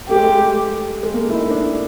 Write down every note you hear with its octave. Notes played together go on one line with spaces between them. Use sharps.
A3 G4
G#3
A3
G#3
A#3
A3
E4
D#4
D4